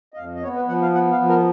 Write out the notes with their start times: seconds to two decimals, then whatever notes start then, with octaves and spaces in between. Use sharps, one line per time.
0.14 D#5
0.17 F2 F5
0.35 D#5
0.43 B3 C#5
0.56 B4
0.68 F3 F#5
0.82 F5
0.94 B3 F#5
1.11 F5
1.20 F3
1.29 A#4